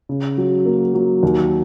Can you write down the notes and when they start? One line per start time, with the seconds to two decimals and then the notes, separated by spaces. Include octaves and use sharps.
0.09 C#3
0.38 F#3
0.66 A#3
0.94 F#3
1.23 D#2